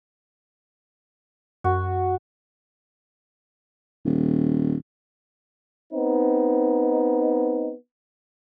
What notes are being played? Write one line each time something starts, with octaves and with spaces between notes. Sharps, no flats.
F#2 F#4
D#1
B3 C4 D#4